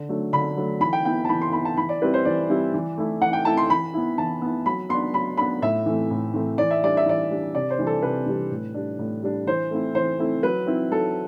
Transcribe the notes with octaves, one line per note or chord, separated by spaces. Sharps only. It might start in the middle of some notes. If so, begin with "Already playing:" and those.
Already playing: D3
F#3 A3 D4
D3 B5
F#3 A3 D4
E3 B5
G5
B3 E4 G5
A5
E3 B5
C6
B3 E4 B5
A5
E3 B5
D5
G3 C4 E4 B4
C5
E3 D5
G3 C4 E4
E3
A3 E4
E3 F#5
G5
A3 E4 A5
C6
E3 B5
B3 E4
E3 A5
B3 E4
F#3 B5
B3 D4 C6
F#3 B5
B3 D4 B5
A2 E5
E3 A3 C4
A2
E3 A3 C4
E3 D5
E5
G3 D4 D5
E5
E3 D5
G3 D4
C3 D5
C5
E3 G3 D4
A4
C3 B4
E3 G3 D4
A2
G3 D4
A2
G3 D4
E3 C5
A3 C4 E4
E3 C5
A3 C4 E4
F#3 B4
C4 E4
F#3 A4